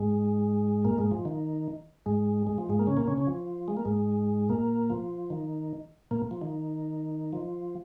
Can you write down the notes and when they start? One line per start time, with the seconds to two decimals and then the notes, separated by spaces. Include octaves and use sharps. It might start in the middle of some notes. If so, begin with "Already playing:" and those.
Already playing: G#2 G#3
0.85 A#2 A#3
0.98 G#2 G#3
1.11 F3
1.25 D#3
2.06 G#2 G#3
2.47 G#3
2.58 F3
2.69 G#2 G#3
2.79 A#3
2.87 C#3 C#4
2.97 A#2 A#3
3.07 C#3 C#4
3.17 C#3 C#4
3.27 F3
3.68 G#3
3.77 A#3
3.85 G#2 G#3
4.49 A#2 A#3
4.90 F3
5.30 D#3
6.11 A#2 A#3
6.31 F3
6.41 D#3
7.33 F3